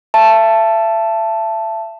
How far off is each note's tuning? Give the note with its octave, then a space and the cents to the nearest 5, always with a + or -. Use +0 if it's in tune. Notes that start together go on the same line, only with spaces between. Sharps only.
E5 +30 A5 +0